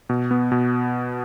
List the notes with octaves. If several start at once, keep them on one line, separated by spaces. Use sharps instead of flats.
B2
B3
B2